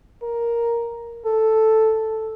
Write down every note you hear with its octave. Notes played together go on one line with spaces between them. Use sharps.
A#4
A4